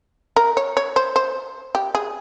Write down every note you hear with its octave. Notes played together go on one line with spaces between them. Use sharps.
A#4
C#5
C#5
C5
C5
G4
G#4